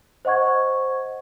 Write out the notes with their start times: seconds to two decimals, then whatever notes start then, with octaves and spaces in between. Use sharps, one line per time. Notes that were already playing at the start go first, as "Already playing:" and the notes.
0.25 C5 D#5 F#5 C#6 G#6